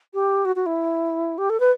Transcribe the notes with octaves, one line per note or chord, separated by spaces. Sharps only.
G4
F#4
F#4
E4
G4
A4
B4